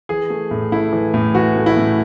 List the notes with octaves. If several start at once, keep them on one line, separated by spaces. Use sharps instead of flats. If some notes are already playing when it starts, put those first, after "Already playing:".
E3 G#4
A3
A2
A3 E4
E3
A2
E3 F#4
A3
E4
A2